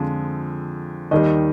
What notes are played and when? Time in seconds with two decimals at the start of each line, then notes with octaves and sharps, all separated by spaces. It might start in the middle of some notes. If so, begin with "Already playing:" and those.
Already playing: F2 D3 F3 G#3
1.11 D#2 D#3 G3 D#5